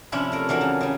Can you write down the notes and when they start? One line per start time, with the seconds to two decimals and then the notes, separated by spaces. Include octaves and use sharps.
0.12 C3 F3 C#4 D4 E4
0.32 A3 A#4
0.49 E3 F#3 D4 A#4
0.61 C#3
0.81 C#3 G3